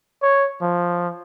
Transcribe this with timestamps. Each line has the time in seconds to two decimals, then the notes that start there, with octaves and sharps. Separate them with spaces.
0.22 C#5
0.62 F3